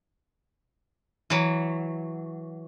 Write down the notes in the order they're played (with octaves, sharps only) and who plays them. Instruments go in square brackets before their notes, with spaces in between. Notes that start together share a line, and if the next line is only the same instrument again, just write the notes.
[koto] E3 F#3